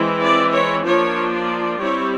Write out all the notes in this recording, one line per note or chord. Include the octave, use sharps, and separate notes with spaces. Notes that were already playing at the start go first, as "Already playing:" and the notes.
Already playing: E3 G#3 C4 E4
D5
C#5
F3 A#3 D4 F4 C#5
D5
G3 C4 E4 C#5